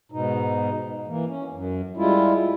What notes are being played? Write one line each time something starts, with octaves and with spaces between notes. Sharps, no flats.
G#2 B2 D#4
E3 A#3
C#4
F#2
G3 G#3 E4 F4